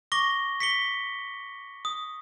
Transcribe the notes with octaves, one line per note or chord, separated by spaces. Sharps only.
C#6 D6 A#6 G7
B6 C#7 G7
D#6